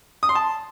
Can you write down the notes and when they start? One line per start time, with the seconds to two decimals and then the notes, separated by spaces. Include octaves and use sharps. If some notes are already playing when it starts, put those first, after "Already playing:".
0.23 D#6
0.29 C6
0.35 A5